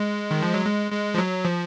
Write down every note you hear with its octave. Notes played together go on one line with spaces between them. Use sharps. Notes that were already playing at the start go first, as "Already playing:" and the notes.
Already playing: G#3
D#3
F3
F#3
G#3
G#3
F3
F#3
F3